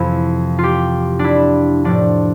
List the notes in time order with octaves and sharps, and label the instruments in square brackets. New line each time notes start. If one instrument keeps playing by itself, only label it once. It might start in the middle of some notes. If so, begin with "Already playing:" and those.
Already playing: [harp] F2 C3 E3 E4
F4
G4
D4 E4
A2 F3 D4